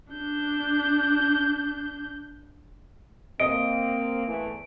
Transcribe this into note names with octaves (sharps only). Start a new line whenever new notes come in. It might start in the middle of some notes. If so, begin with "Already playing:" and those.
D4 G6
A#3 C4 D#5 D7
E2 E3 A3